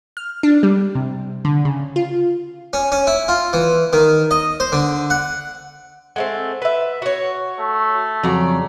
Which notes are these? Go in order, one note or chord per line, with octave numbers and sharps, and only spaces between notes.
F6
D4
G3
C3
D3
C#3
F4
C#4
C#4
E4
F4
E3
D#3
D#5
C5
D3
F#5
G#3 A3 C4 F#5
B4 E5
F#4 C#5
A3
F2 C#3 F#3 F#4 D5 A#5